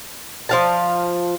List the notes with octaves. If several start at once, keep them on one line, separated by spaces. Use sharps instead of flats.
F3 F5 A5